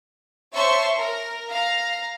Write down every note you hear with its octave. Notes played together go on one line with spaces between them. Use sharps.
C5 C#5 E5 A5 C6 C#6
A#4
F5 A#5